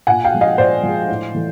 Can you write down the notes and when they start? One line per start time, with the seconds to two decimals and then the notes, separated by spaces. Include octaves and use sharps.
0.07 A#2 F#5 G#5
0.24 F5 G5
0.33 F3 G#3
0.41 D#5 F5
0.58 A#2 C5 D5
0.83 F3 G#3
1.09 A2
1.35 E3 A3